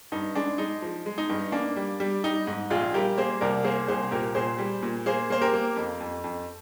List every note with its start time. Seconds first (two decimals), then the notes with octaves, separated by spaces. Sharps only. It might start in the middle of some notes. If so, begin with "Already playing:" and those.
0.12 G2 D#4
0.35 G#3 D4
0.58 G#3 D#4
0.82 F3
1.06 G#3
1.18 D#4
1.30 G2
1.52 A#3 D4
1.76 G3
2.00 G3
2.24 G3 D#4
2.47 G#2
2.70 A#1 F4 G#4
2.94 G3 G4 A#4
3.18 A#3 G#4 C5
3.41 C2 A#4 D5
3.64 A#3 G#4 C5
3.88 C2 G#4 C5
4.11 A#2 G4 A#4
4.35 A#2 G#4 C5
4.58 G3
4.82 A#2
5.06 A#3 G#4 C5
5.30 A#3 C5
5.41 G4 A#4
5.54 A#3
5.76 F2
6.01 F2
6.24 F2